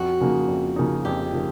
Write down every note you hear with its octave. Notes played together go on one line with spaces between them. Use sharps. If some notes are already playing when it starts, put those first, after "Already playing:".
Already playing: F2 F#4
C#3 F3 A#3 D#4
F2
C#3 F3 A#3 D#4
F2 G4
C#3 F3 A#3 D#4